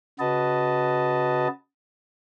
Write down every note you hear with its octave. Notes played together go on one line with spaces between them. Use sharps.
C#3 F#4 B4 D#5 A5